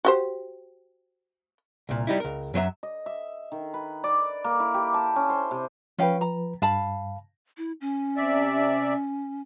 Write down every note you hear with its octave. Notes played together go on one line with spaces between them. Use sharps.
F#4 G4 C5
C2 A#2
G3 D#4 E4
C#2 A#4
F#2 F#3 C5 E5
D#5
E5
D#3
B4
D5
A#3
E4
G4
A5
C#4
C5
C3
F3 C#4 B4 F5 G5
A#5
G2 F5 A5 B5
E4
C#4
C3 D5 E5